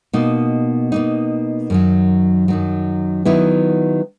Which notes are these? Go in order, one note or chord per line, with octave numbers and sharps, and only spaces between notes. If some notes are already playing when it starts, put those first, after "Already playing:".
B2 A#3 D#4
B2 A#3 D#4
F#2 D#3 F#3
F#2 D#3 F#3
D#3 F#3 B3 E4